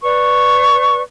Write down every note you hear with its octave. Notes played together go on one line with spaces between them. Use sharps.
B4 D5 C#6